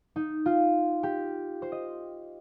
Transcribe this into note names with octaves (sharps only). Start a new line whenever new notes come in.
D#4
F4
G4
C5
D#5